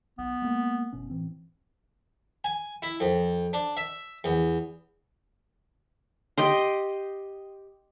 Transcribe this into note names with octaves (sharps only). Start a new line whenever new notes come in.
B1 B3
G#3 A#3
F#1 B2 C#4
A2 E3 C4
G#5
E4
F2
D4
E5
E2
G4 D#5 G5 C6